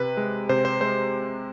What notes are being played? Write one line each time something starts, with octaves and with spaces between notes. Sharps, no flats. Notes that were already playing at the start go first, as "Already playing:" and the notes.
Already playing: C3 B4
G#3
C3 C5
C5
G#3 C5